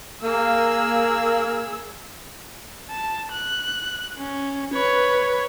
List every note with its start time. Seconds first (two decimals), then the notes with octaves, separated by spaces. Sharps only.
0.23 A#3 G#4 E6
2.91 A5
3.32 F#6
4.18 C#4
4.73 B4 C#5